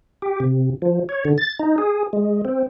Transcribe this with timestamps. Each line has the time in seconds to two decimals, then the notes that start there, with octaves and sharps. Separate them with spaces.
0.22 G4
0.40 C3
0.82 F3
1.09 C#5
1.25 D3
1.38 A6
1.59 D#4
1.78 G#4
2.13 G#3
2.45 C4